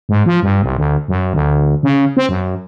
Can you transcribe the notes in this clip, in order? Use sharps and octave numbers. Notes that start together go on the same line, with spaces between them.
G#2
F3
G2
C2
D2
F#2
D2
C#3
C4
F#2